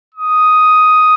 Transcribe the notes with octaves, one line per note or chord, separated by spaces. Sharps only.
D#6